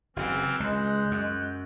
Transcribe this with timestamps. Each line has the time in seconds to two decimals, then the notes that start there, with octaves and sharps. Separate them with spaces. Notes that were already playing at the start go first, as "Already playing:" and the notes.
0.16 F#1 C#3 E3 C4 F6
0.60 C#2 G#3 F#6 G6
1.11 F#2